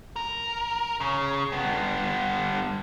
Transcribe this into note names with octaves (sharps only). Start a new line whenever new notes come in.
A#4
C#3
G2 B3